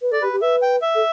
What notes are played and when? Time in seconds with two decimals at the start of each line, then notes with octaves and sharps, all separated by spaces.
0.02 B4
0.12 A4 D5
0.22 G4 B4
0.33 G4
0.42 B4 E5
0.62 G5
0.82 E5
0.95 A4